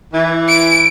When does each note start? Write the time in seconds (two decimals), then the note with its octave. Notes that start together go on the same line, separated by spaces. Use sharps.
0.13 E3
0.48 D7